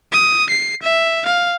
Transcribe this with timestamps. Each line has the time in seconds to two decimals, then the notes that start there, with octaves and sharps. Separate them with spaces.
0.13 D#6
0.50 C7
0.83 E5
1.26 F5